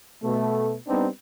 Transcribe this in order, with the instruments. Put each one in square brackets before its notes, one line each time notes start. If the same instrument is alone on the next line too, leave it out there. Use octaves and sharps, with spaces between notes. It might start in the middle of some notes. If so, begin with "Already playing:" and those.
[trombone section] B2 A3
G3 B3 C4 D4 D#4